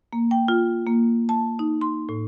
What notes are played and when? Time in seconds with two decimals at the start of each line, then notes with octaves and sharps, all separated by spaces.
0.13 A#3
0.31 G5
0.48 F4
0.87 A#3
1.29 A5
1.59 D#4
1.81 C6
2.09 A2